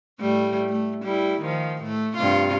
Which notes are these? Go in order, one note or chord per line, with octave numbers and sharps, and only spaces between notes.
A2 G3 A3
A3
G3 E4
D#3 F3
A2 A3
G2 C3 F4